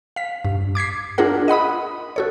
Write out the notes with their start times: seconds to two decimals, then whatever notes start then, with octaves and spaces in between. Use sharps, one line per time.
0.16 F5 B6
0.45 G2
0.75 D6 G#6 B6 C7
1.18 D4 F4 G#4 A#4 F#5
1.48 D#5 F#5 B5 D#6
2.16 F#4 A4 C#5